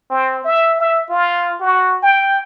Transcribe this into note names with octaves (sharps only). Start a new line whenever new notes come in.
C4
E5
E5
F4
F#4
G5